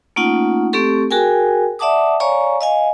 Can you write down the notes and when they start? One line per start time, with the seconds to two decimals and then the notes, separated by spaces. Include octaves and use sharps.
0.16 A3 A#3 C#4 D#4 F4 F#5
0.73 A3 C4 G4 A4 C#6
1.11 F#4 G#4 A#4 G5 G#5
1.79 D5 E5 F#5 A5 D6 D#6
2.20 C#5 D5 F5 G#5 A#5 C#6
2.61 D#5 F5 G#5